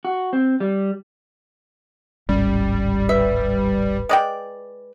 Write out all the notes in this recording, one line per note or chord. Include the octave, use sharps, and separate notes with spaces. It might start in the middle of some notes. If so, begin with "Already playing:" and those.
F#4
C4
G3
D1 G#1 G3 C#4
B4 E5
G#3 D5 G5